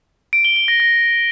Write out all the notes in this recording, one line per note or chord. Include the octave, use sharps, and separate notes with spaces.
D7
G7
G7
A#6
A#6